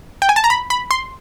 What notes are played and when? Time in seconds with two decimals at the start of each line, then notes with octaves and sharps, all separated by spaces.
0.22 G5
0.29 G#5
0.36 A5
0.44 A#5
0.50 B5
0.70 B5
0.91 C6